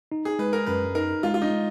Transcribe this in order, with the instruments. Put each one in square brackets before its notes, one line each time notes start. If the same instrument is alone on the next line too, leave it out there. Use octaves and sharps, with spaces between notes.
[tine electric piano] D#4
[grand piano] G#4
[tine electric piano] G#3 [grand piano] B4
[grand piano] A#4
[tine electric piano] F#2 [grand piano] B4
[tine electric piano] D#4 [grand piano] A#4
[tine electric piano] G#3 [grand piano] F4
[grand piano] F4
D#4
[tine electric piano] G#3